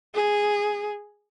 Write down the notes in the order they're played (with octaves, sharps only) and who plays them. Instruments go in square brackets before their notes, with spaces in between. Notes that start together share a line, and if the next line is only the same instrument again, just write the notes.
[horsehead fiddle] G#4